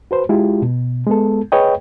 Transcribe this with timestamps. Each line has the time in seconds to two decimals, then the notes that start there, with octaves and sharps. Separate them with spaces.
0.11 F#4 B4 C5
0.29 G#3 E4 F4 G4
0.62 B2
1.07 G#3 B3 A4
1.52 G#4 B4 C#5 D#5 G5